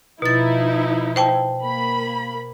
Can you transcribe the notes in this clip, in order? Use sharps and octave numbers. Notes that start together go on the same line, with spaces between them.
B2 F3 D#4 E4 A6
C5 G5 A5
A#3 B5